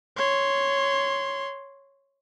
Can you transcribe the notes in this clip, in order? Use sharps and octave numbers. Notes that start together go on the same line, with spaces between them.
C#5 C6